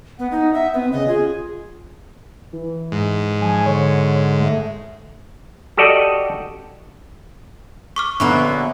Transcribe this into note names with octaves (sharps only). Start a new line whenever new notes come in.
B3 F#5
D#4
E5
B3 C4
C#3 D#5
F4 G#4
E3
G#2
F3 G#5
D3 C#5
A3
F#4 G4 A4 D5 D#5 G5
C#6 D6 F6
A#1 D3 F#3 A#3 B3 B5 C#6